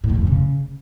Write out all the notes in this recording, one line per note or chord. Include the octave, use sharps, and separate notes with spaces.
A2
E2
F2
C3
C#3